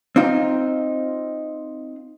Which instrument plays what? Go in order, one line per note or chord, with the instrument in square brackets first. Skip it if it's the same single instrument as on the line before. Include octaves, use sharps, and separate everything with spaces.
[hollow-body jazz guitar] C4 D#4 F4